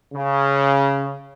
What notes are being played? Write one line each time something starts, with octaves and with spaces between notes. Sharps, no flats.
C#3